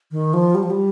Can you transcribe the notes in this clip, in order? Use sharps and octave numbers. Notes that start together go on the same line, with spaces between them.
D#3
F3
G3
F3
G3